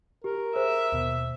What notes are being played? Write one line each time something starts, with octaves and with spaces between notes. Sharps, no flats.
G4 A#4
G#4 C5 E5
D#2 B2